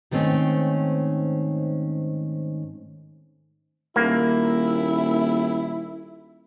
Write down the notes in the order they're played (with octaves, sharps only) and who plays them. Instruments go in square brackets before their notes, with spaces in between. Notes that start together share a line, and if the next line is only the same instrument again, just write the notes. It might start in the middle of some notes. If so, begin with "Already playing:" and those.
[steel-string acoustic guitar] G#2 D#3 A3 A#3 C4 C#4
[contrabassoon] D#1 [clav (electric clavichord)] A#3 [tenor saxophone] E4